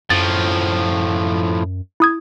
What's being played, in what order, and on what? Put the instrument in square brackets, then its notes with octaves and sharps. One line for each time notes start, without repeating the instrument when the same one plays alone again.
[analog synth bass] F#2 [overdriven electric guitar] A2 F3 [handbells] A6
[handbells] E4 D#6 G#6